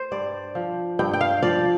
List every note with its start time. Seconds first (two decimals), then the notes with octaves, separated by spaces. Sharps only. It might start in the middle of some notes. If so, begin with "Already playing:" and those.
Already playing: C5
0.12 G2 D5
0.55 F3
0.99 G2 G5
1.13 G5
1.21 F5
1.43 F3 D5